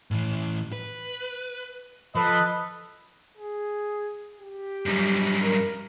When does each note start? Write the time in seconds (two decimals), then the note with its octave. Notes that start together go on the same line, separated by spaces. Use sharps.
0.11 A2 E3
0.73 B4
2.15 F3 A4 B4 D#5
3.38 G#4
4.41 G4
4.86 F#2 G3
5.42 A#4